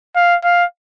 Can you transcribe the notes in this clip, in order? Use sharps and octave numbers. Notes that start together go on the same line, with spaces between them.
F5
F5